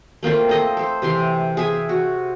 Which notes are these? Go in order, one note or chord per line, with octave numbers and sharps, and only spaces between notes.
A3 A#3 C4 F4
A4 C5 D#5
A4 C5
C3 E3 C6
G#4 E5 G#5
F#4